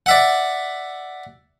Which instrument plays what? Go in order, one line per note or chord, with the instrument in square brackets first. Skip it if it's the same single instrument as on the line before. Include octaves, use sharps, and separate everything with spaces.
[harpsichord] D5 E5 F#5